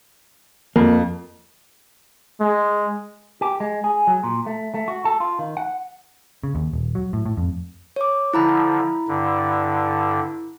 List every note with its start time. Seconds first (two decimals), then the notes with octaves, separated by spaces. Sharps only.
0.76 F2 A#3
2.41 G#3
3.41 G4
3.60 G#3
3.84 G#4
4.07 F#3
4.23 A#2
4.46 A3
4.74 A3
4.88 F#4
5.05 A4
5.20 F4
5.39 D#3
5.57 F#5
6.44 C#3
6.55 D#2
6.73 D#1
6.95 F#3
7.13 A2
7.26 A2
7.37 F2
7.96 C#5 D6
8.34 D3 F3 E4 A#5 B5
9.08 G2 D3